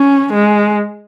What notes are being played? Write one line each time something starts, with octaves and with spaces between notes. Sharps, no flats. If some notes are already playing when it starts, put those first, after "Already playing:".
Already playing: C#4
G#3